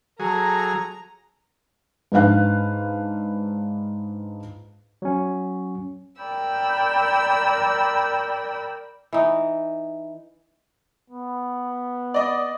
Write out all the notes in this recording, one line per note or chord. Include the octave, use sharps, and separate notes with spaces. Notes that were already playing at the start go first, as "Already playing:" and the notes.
F#3 G#4 A4 A#5
G#2 D4 B4 F5 F#6
F#3 C#4
A#4 D5 G5 B5 E6
E3 D#4
B3
D5 D#5